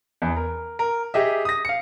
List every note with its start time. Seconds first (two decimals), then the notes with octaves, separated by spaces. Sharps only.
0.22 E2
0.37 A#4
0.79 A#4
1.14 G4 G#4 D#5 E5
1.45 D#6 A#6
1.65 F5 C#7